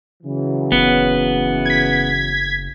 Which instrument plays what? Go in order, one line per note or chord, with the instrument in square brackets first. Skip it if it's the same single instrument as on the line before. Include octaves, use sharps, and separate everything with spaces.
[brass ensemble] C#3 E3 F#3
[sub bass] F#1 [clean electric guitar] B3
[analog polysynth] G#6 B6